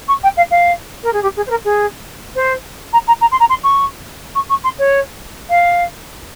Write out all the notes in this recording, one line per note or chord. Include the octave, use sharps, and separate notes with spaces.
C#6
G5
F5
F5
A#4
G#4
G4
G#4
C5
A#4
G#4
C5
A#5
A#5
A#5
C6
A#5
C6
C#6
C#6
C#6
C6
C#5
F5